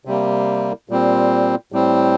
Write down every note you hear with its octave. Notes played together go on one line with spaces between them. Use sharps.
C3 G3 A#3
A#2 G3 C4
A2 G3 C4